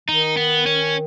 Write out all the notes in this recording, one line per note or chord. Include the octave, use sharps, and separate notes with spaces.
D#3 D#4
B3
C#4